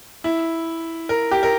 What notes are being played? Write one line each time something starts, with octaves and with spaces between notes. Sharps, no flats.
E4
A#4
G4
A#4